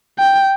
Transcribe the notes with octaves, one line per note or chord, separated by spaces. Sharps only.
G5